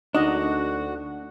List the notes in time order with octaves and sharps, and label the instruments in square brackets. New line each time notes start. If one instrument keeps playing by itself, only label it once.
[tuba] D2 [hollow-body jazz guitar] D4 [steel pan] D#4 D#5 [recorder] F#4